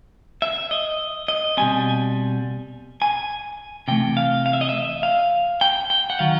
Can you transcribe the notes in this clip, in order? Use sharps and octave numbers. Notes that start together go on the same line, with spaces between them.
E5
D#5
D#5
B2 G3 C4 G#5
G#5
C3 E3 A3 G5
F5
F5
E5
D#5
E5
F5
G5
G5
F#5
D#3 F#3 F5